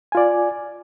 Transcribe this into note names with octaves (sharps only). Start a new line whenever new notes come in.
F4 D5 G#5